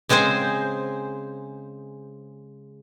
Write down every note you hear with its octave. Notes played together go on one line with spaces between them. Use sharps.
C#3 G#3 C4 G#4 C5